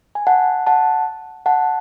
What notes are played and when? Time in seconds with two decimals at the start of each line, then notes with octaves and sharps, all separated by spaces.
0.15 G#5
0.27 F#5 A5
0.67 F#5 A5
1.46 F#5 A5